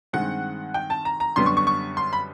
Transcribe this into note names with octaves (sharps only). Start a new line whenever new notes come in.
G2 D#3 G#3 C4 F#5
G5
A5
A#5
A#5
F#2 D3 G3 B3 C6
C#6
C#6
C#6
C6
B5